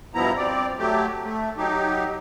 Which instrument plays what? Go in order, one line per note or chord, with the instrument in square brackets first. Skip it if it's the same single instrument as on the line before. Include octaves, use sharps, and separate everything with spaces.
[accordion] G2 B2 F3 B3 E4 A#5
C4 D5
F#3 A3 G4
A3
F#3 D#4 G4